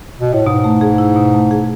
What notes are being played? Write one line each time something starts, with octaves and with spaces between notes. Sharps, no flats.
B2
A2
G#2 B2
A3
G#4
E4
B2
A3
G#4